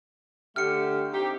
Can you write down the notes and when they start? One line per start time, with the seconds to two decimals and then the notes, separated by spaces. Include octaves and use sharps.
0.56 D3 A3 G4 F6 C#7
1.13 C4 D#4 G4